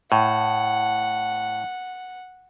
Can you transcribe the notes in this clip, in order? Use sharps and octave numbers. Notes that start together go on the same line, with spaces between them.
A2 F#5